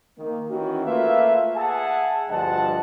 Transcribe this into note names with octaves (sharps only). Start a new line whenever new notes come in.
D#3 A#3
D#3 E3 C#4 F#4
A3 A#3 F4 B4 E5 F5
G#4 E5 F#5 G#5 A5
D2 G2 F3 D#5 F#5 A5